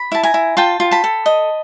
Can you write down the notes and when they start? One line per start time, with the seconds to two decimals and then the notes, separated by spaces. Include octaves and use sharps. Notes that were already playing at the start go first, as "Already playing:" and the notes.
Already playing: B5
0.12 E4 A5
0.23 G#5 A#5
0.34 E4
0.57 F4 G5 A5
0.80 F4
0.91 A5 B5
1.04 A4
1.26 D#5